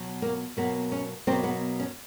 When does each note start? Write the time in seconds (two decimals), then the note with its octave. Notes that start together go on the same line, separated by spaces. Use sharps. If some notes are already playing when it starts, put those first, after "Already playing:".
Already playing: B2 F#3
0.22 A#3
0.57 B2 F#3 A#3 B3
0.92 C#4
1.27 B2 F#3 A#3 C4
1.44 B3
1.80 C#4